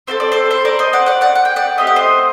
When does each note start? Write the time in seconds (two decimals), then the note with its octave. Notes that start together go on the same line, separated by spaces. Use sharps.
0.07 C4 F#4 A4 C5
0.20 D5
0.32 A4 C5
0.51 A4 C5
0.65 A#4 D5
0.79 C5 D#5
0.93 D5 F#5
1.06 D5 F#5
1.21 D5 F#5
1.35 F#5
1.45 G5
1.56 D5 F#5
1.78 A3 C4 G4 D#5
1.87 F#5
1.96 C5 D#5